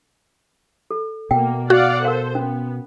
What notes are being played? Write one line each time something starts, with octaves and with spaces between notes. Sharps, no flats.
A4
B2 A#3 G5
F#4 D5 F5 F#5
A4 A#4 C5 F5
B3 C#4